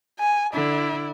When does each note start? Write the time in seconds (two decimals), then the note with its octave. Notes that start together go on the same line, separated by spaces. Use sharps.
0.19 G#5
0.54 D3 E4